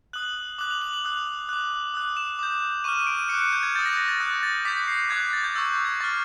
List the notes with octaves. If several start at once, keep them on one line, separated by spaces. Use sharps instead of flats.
D#6 F#6 F#7
D6 F#6 F#7
F7
F#7
F7
D#6 F#6
D6 F#6
D#6 F#6
E7
D6 G6
C#6 F6 D#7
D#7
D7
D#7
D7
D6 F#6 C#7
C#7
G6
G#6
D#6 G6 A6
A#6
A#6
A6
D#6 F#6
A6
A6
D6 G6 B6
C7
D6 F#6 G#6
A6
G6
C#6 E6 G6 G#6
G#6
C#6 F6 A6